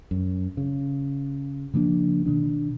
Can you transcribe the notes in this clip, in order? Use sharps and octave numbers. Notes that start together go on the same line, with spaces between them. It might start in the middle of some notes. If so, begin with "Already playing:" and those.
F#2
C#3
C#3 F3 A#3 D4
B2 D#3 D4